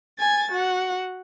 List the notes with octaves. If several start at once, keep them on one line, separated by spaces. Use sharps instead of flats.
G#5 G#6 A6
F#4 F#5